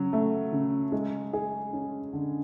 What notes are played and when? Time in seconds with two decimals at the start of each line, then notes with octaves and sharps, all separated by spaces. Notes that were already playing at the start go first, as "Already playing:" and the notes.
Already playing: C#3 F#3
0.13 A3
0.52 C#3
0.92 G#3
1.33 G#4
1.73 C#4
2.13 D3